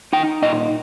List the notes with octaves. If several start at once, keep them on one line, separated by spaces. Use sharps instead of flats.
D#4 G5
A#2 D#5